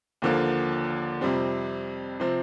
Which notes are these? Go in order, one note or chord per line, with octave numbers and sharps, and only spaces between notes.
D#2 D3 F3 A#3
F2 C3 G3 C4
C3 F3 C4